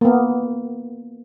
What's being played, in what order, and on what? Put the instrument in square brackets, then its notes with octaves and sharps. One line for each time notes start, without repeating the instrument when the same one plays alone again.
[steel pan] A#3 B3